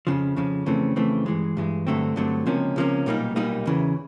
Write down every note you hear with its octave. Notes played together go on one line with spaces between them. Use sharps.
F2 C#3 F3
F2 C#3 F3
F2 C#3 E3 A3 C4
F2 C#3 E3 A3 C4
G2 E3 G#3
G2 E3 G#3
G2 D3 F#3 A3 C4
G2 D3 F#3 A3 C4
C#2 C3 F3 A#3 C#4
C#2 C3 F3 A#3 C#4
B1 A#2 G3 A#3 D#4
B1 A#2 G3 A#3 D#4
E2 C#3 E3